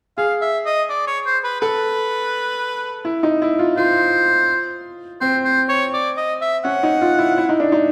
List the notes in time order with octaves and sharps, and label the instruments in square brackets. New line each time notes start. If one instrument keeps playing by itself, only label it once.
[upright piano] G#4 [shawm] F5
[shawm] E5
D#5
D5
C#5
C5
B4
[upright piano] A4 [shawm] B4
[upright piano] E4
D#4
E4
F4
[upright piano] F4 [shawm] C5
[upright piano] C4 [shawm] C5
[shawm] C5
C#5
D5
D#5
E5
[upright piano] C#4 [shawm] F#5
[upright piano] D#4
F4
E4
E4
D#4
D4
D#4